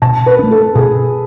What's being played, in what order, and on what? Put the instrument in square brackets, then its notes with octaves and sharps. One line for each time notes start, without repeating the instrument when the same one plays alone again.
[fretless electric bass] B2 [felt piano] A5
[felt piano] B4
[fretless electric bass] A3 D4
[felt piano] A4
[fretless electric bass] B2 [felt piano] G#4